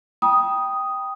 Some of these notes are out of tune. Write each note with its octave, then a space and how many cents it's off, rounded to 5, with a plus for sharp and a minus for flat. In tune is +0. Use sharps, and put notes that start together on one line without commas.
G5 +0 B5 -40 D#6 +0